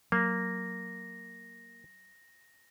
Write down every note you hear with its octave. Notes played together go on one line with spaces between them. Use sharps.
F#3 A#3 A#6